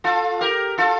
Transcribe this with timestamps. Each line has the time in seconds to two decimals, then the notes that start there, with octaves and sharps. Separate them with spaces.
0.04 F4 A4
0.41 G4 A#4
0.78 F4 A4